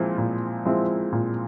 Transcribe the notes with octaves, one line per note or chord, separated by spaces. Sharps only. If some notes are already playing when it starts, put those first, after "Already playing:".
Already playing: A#2 F3 G#3 C4 E4
A#2
F3 G#3 C4 E4
A#2